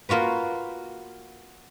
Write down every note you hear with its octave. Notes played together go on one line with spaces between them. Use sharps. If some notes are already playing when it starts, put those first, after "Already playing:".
A#3 F4 F#4 B4